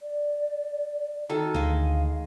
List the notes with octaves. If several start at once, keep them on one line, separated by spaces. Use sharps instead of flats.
D5
D#3 F#4 A4
D2 G#3 D#5 F5